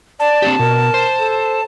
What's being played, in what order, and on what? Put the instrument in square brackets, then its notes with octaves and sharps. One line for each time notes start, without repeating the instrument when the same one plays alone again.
[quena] D5 [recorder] A5
[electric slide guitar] C4 D4 G4
[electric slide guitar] B2 [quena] A#4
[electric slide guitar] C5
[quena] A4